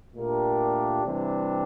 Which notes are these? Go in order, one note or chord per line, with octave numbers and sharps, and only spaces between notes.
A#2 A3 D4 G4 A#4
C3 E3 G3 D4 G4